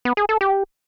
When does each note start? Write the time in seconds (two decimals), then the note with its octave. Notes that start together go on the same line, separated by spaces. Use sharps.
0.05 B3
0.17 G#4
0.29 A4
0.41 G4